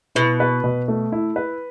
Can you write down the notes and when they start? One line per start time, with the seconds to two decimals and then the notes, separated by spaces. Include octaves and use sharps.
0.15 B2 E4
0.40 B4
0.64 B2
0.88 A3
1.12 E4
1.36 B4